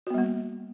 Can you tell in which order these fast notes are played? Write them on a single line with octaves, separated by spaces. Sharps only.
F#4 B3 G3 A#3